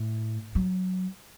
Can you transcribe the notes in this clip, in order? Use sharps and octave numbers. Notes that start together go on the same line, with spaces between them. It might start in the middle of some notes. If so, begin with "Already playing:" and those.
Already playing: A2
F#3